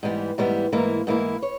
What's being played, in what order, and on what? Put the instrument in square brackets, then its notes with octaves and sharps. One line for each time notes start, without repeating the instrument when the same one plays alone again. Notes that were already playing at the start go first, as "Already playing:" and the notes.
[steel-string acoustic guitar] G#2 E3 G3 B3
G#2 E3 G3 B3
G#2 E3 A#3 E4
G#2 E3 A#3 E4
C#5